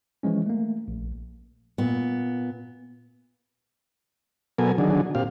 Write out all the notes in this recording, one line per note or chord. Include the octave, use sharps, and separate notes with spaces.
E3 F3 G#3 C#4
A3 A#3
A#1
A#2 B3
B2 F#3 B3 A4 A#4 G#5
D3 D#3 F#3 D4 G#4
A#2 C4 G4 F5